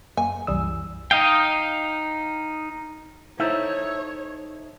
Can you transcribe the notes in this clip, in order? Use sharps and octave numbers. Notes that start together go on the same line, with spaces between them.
F#2 A#3 G#5
C2 F#2 E3 G3 D#6 E6
D#4 D#5 F5 G5
D#4 E4 A4 C5 C#5 E5 A#5